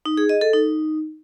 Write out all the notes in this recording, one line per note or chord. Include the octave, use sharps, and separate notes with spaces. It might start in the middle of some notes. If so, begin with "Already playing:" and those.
D#4
G#4
D#5
A4
D#4